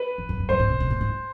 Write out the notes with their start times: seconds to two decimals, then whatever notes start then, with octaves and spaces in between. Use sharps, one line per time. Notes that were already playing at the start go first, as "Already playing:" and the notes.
Already playing: B4
0.18 E2
0.29 F2
0.39 F#2
0.49 G2 C5
0.59 A2
0.70 B2
0.80 B2
0.90 A#2
1.01 G#2